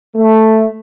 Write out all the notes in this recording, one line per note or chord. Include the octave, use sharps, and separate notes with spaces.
A3